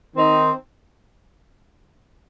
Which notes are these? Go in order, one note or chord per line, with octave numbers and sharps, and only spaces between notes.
D#3 C4 D#4